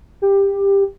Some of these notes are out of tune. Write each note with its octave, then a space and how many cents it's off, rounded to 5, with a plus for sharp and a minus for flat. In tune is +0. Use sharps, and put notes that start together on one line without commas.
G4 +15